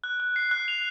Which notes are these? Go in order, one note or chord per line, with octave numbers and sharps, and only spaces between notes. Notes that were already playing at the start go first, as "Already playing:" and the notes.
F#6
F#6
C7
F#6
F7